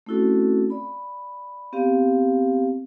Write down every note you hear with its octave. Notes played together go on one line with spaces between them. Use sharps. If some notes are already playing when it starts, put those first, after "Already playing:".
A3 C4 C#4 E4 F#4 A4
D5 B5
B3 C4 G4 F5